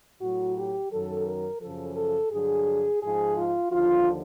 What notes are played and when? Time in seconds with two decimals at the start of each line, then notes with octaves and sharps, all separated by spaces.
0.22 A2 F#3 F#4
0.58 G4
0.92 F#2 D#3 F#3 A4
1.27 A#4
1.62 F#2 C#3 F3 A4
1.97 A4
2.32 G2 D3 F#3 G#4
3.02 G#2 F3 G#4
3.37 F4
3.72 D#2 D3 F3 F4